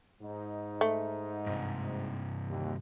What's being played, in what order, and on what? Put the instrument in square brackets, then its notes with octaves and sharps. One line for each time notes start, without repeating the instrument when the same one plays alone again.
[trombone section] G#2 D#4
[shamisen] A3
[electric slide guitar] G2 C3
[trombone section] D#2